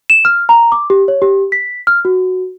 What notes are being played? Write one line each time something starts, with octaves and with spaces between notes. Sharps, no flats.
E7
F6
A#5
D6
G4
C#5
G4
B6
F6
F#4